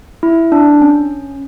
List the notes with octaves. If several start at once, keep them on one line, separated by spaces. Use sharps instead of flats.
E4
D4
C#4